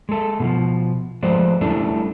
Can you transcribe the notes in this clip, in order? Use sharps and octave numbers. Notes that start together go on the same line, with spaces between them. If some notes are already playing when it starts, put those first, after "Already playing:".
G#3 A4
B2 D#3 F3
F3 G#3 A3 B4 C5 D5
G3 A3 C#4 D4 E4 A4